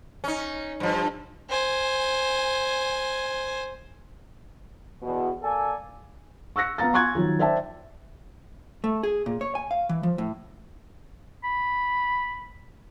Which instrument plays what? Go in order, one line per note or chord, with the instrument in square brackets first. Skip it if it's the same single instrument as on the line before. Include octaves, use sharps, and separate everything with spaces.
[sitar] C#4 D#4
G2 F3
[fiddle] C5 G#5
[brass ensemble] E2 B2
A#3 A4 D5 G#5
[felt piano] C#6 E6 F#6 A#6 C#7
B3 F5 A#5 A6
G#5 C6 C#6 F#6 G#6
D#3 F3 F#3
C5 D5 E5 G5 A5
[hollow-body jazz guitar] A3
G#4
A#2
C#5
G#5
F5
E3
F3
A2
[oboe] B5